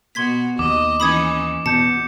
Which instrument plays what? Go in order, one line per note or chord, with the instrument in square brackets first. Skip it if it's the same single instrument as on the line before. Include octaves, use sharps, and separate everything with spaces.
[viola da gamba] B2 F#4 [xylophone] C6 G#6 B6
[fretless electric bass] D#2 [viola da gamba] D#5 [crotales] D6
[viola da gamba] E3 C#4 D#4 [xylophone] B5 D#6 G#6
[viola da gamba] E2 [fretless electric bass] B2 [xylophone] A5 [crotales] G6 C#7